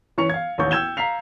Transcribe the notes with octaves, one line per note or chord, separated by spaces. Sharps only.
E3 C#4 C#6 C#7 F7
F5 G#6
A1 D#2 E3 C#4 C#6 G6
G5 E6 G6 G#6 E7 G7
F5 A#5 B6 C7 F7